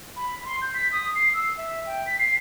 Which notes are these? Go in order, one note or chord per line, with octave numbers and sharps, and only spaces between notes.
B5
C6
G6
B6
D#6
C7
E6
E5
G5
B6
C7